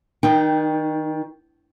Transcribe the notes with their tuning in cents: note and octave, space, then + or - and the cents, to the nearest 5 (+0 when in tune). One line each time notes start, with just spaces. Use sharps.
D#3 +25 D#4 -25 G5 +0